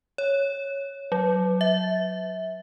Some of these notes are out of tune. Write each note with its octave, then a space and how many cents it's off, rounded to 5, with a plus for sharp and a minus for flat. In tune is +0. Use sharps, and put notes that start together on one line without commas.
C#5 +0
F#3 +0
E5 -25